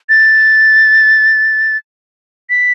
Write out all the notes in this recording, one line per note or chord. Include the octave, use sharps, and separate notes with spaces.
A6
B6